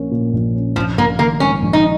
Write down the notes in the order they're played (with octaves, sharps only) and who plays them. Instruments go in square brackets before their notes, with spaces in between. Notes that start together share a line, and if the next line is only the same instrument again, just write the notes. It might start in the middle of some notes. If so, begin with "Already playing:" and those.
Already playing: [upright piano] A#1 A#3 C#4
A#2
A#1
C#4
[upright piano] A#1 [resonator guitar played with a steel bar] F3
[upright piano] A#1 [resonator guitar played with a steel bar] A#3
[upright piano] D#3 [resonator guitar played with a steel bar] A#3
[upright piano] G#2 [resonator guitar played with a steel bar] C#4
[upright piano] A#1
[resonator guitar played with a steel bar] D#4